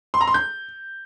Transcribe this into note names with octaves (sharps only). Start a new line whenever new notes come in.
C6
A#5
C6
G6